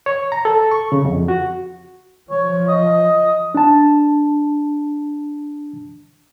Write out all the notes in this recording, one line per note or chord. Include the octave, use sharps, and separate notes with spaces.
C#5
A#5
A4
C#6
C#3
F2
F#4
F3 C#5
D#5
D4 A5